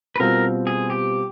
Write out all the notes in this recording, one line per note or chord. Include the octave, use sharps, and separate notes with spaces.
B4
B2 G3 C4 F4 A#4
G#4
G4